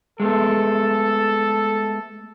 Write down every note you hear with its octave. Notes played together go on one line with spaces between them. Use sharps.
G#3 A3 B3 A4